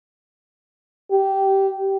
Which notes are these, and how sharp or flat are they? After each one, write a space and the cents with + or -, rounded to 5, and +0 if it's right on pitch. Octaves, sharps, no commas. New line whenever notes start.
G4 -15